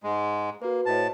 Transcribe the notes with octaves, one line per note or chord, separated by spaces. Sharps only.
G#2 G#3
A#3 F#4 B4
A2 C5 C#5 D#5 A5